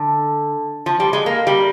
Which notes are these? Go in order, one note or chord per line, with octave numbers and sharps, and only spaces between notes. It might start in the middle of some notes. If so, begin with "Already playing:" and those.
Already playing: D3
F3
G3
G#3
A#3
G3